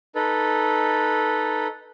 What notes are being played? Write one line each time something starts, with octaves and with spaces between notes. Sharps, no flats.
D#4 A4 B4